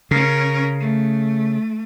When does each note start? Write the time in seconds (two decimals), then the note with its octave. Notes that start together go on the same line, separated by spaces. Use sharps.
0.11 C#3 C#4 A#4
0.80 A3